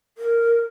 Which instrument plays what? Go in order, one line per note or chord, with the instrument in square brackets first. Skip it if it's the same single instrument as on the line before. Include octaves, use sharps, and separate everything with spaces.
[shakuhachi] A#4